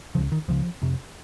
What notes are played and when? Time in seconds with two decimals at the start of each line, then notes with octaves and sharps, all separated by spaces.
0.15 C#3 F3
0.18 C#2
0.32 D#3
0.48 C#2 C#3 F3
0.82 F2 C3